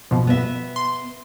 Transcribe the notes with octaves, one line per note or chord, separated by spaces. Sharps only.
B2 F3
B3 E5
C6